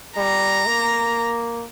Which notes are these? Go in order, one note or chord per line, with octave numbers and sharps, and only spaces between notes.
G3 A#5
A#3